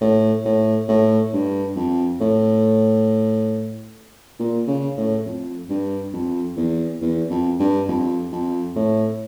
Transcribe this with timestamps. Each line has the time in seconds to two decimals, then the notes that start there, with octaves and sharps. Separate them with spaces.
0.01 A2
0.45 A2
0.89 A2
1.33 G2
1.76 F2
2.21 A2
4.39 A#2
4.68 C#3
4.97 A2
5.26 F2
5.70 G2
6.13 F2
6.57 E2
7.02 E2
7.30 F2
7.60 G2
7.88 F2
8.32 F2
8.76 A2